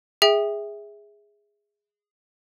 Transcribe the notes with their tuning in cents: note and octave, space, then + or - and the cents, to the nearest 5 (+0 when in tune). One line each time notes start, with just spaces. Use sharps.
G#4 -10 E5 -10 G5 +20